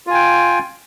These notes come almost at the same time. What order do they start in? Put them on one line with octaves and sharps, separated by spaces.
F4 G#5 G5